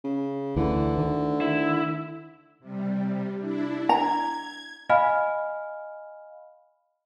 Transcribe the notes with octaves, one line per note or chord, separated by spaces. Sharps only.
C#3
D2 D3 E3
D2 D#3
E4
C3 G3
D4 E4
A#5 G#6
D#5 F5 G#5 B5 F6